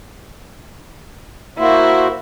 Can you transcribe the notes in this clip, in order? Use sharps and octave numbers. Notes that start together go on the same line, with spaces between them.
A#3 E4 F#4 C5